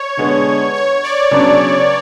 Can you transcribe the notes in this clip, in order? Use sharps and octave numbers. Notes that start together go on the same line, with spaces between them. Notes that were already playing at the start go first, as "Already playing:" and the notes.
Already playing: C#5
D3 G#3 B3
C#5
D5
C#3 F#3 B3 D4